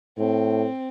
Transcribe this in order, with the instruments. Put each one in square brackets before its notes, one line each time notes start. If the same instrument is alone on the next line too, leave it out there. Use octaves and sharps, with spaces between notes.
[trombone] A2 [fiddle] C4